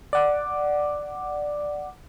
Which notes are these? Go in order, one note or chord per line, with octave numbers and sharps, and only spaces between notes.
D5 F#5 D6